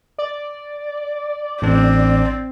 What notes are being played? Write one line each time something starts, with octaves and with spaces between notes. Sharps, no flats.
D5
A1 C4 D4